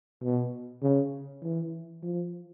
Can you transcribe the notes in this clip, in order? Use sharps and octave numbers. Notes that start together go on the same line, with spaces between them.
B2
C#3
E3
F3